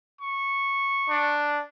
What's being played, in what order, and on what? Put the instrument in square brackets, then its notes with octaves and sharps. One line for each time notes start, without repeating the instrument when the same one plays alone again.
[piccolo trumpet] C#6
[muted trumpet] D4